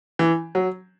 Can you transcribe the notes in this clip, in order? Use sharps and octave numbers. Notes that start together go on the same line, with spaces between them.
E3
F#3